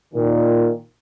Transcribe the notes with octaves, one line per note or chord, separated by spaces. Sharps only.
A#2 D#3